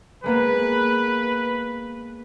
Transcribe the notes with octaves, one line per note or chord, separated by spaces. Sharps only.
G#3 A#3 B3 B4